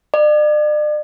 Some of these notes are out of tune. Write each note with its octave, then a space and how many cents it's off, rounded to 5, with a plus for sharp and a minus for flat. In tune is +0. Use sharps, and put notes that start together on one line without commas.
D5 +40